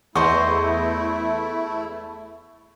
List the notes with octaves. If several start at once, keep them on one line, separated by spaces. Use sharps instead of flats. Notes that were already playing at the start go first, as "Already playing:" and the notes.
E2 A3 E4 C5 D#5 C#6